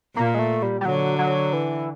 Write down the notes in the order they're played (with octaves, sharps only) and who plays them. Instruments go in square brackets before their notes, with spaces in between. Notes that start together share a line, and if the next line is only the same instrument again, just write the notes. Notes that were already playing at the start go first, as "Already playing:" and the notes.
[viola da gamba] A#2 [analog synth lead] A#3
[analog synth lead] G#3
A3
G3
G3
[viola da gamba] D3 [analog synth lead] F#3
[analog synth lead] F#3
E3